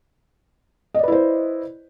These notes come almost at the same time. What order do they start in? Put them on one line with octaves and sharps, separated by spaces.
D#5 D5 B4 E4 C5